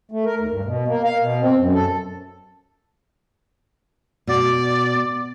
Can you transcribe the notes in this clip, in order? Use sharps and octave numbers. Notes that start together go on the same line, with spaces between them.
A3
A#4
D#2
G2
B2
A#3
F5
B2
C4
F#2
A4
B2 D5